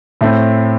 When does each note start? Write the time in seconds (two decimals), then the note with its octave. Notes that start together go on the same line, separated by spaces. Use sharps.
0.21 A2 A3 C4